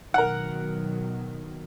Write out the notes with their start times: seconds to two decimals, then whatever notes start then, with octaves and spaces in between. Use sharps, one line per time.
0.14 B2 D#3 F#3 A#4 F#5